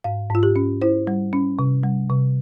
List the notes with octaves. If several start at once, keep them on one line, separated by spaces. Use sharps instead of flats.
G#2 F5
G#2 F4
G4
C#4
E4 C5
G3
C#4
C3
G3
C3